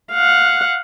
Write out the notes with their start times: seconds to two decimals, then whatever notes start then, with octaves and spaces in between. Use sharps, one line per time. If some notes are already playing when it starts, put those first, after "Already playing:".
0.13 F5 F#5